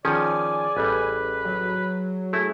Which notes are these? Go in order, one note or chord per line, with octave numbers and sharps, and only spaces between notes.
D#3 F3 C#4 G#4 D5 G#5
A1 G3 B4
F#3
A3 E4 G#4